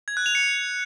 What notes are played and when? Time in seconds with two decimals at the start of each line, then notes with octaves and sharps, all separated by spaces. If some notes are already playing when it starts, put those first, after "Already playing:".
0.08 G#6
0.17 F#6
0.26 F7
0.35 C#7